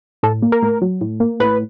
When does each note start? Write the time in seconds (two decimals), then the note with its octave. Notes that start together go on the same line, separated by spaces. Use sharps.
0.23 A2 A4
0.42 A#3
0.52 A#4
0.62 A2
0.82 F#3
1.01 A2
1.20 A#3
1.40 A2 B4